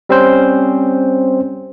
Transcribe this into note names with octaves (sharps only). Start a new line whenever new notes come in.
G3 C4 C#4 C5